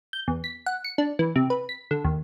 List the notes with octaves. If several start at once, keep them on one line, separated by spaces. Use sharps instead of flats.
G6
E2
B6
F#5
C#7
D4
E3
C3
B4
B6
D3
D#2